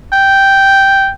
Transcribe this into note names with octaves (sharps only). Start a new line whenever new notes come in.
G5